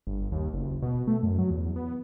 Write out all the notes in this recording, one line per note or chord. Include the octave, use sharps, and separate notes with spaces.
G1
D#2
F#1
B2
A3
F#2
F#3
E2
B3